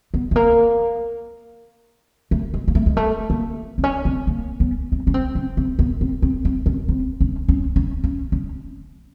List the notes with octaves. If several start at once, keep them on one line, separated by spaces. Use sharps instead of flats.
B3
A3
A#3
A3
G#3
A#3
A3
G#3
A3
A#3
C4
C#4
C4
A#3
B3
C4
C#4
C4
C#4
C4
B3
C4
C4
C4
C#4
C4
C#4
C#4
C#4
C#4
C#4